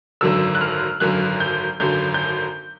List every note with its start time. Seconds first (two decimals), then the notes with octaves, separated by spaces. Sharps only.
0.21 G#1 F#2 D3 F#3 E6
0.55 F#6
0.61 F6
1.00 G#1 F#2 D3 F#3 F#6
1.40 G6
1.80 G#1 F#2 D3 F#3 G6
2.14 G6